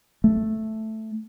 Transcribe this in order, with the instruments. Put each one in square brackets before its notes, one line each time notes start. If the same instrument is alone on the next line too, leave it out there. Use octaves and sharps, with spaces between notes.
[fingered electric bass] A3